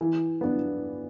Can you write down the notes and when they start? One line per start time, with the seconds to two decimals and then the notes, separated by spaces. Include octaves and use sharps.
0.01 E3
0.41 B3 D4